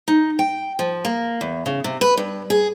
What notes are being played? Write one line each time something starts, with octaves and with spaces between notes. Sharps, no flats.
D#4
G5
F3
A#3
E2
C#3
C3
B4
G2
G#4